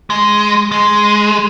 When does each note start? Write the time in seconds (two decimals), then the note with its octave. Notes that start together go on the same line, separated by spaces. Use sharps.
0.10 G#3
0.72 G#3